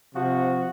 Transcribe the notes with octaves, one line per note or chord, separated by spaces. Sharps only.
C3 F3 F#4